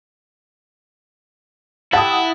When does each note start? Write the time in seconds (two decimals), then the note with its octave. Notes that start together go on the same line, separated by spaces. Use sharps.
1.93 E4 G4 F#5 A5 D#6 A6